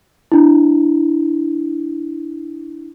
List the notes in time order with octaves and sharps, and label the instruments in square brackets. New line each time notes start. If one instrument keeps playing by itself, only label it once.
[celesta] D4 E4